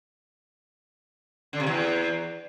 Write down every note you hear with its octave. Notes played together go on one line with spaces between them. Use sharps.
D3
C3
E2